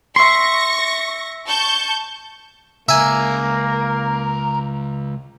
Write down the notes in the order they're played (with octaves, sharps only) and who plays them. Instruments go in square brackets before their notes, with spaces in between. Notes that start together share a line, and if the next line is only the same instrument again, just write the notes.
[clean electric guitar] E5 C6 [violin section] C#6 A#6
[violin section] A5 C#6 G6
[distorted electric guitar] C#2 [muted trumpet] A#3 [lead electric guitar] A#4 [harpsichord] E5 G#5